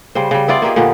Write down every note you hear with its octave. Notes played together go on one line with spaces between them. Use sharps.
C#3 G3 C5
C#3 G3
B3 E4 F4 D5
A#3 D#4 G4 G#4
A#2 D3 B3 G4